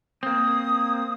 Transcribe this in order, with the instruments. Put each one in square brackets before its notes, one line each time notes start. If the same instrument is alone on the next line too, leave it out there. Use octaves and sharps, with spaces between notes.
[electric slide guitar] A#3 C4 [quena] D#6